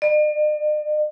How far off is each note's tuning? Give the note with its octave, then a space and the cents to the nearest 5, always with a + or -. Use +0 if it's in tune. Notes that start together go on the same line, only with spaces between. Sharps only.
D5 +45